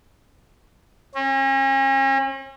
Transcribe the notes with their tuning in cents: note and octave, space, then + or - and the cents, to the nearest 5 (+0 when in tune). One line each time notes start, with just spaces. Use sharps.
C#4 -40